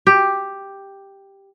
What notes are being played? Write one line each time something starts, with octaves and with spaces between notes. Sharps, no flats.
G4